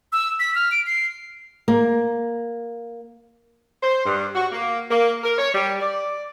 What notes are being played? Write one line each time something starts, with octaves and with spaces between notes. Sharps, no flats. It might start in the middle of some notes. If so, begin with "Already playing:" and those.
E6
B6
F6
D7
C7
A#3
C5
G2
F#4
A#3
A#3
A#4
C#5
G3
D5